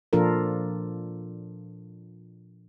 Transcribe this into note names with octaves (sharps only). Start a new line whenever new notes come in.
A#2 F3 D4 F4 A4 A#4